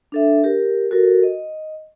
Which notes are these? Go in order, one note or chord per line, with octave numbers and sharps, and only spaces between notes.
D4 A4 E5
G4 A#4
F#4 A4 A#4
D#5